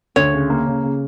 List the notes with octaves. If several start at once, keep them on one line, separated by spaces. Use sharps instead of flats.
D2 C#5
C#3
A#3
C#3
C#3